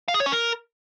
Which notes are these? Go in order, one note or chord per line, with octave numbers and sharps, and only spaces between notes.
F5
G#4
C#5
C#4
A#4